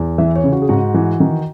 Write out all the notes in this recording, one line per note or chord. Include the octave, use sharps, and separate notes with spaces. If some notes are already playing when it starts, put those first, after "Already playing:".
Already playing: E2
E3 E5
C#5
C#3
F#4
G#4
G#2 F#4
E3
D#3